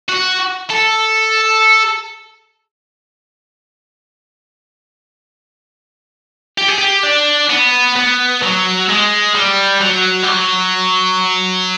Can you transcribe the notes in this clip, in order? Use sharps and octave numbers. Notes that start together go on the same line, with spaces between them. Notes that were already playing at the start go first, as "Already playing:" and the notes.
F#4
A4
G4
G#4
G4
D4
B3
B3
F#3
G#3
G3
F#3
G3
F#3